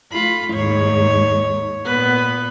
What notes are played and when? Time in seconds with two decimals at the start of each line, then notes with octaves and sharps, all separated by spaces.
0.12 A3 F4 B5
0.53 D#2 G#2 C#5
1.85 A#2 B3 B4